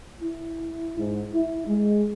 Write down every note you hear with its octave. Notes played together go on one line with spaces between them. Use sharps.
E4
G#2
E4
G#3